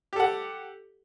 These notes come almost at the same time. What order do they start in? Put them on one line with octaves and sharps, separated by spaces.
G4 A4 F#5